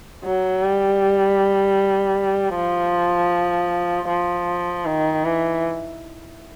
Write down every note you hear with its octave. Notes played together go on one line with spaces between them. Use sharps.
F#3
G3
F3
F3
D#3
E3